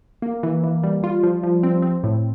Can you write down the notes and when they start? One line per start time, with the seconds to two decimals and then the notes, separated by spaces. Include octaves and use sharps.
0.22 A#3
0.43 E3
0.64 E3
0.83 G3
1.04 F4
1.23 F3
1.43 F3
1.63 C4
1.82 C4
2.04 A2